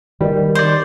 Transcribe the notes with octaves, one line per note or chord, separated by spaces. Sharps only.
D#3 G3
C5 D5 C6